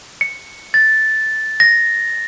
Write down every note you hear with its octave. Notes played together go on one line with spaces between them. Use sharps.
C#7
A6
A#6